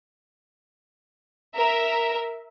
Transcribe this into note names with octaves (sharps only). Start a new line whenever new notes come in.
A#4 E5